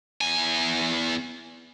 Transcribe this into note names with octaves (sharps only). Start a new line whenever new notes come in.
E2 G#5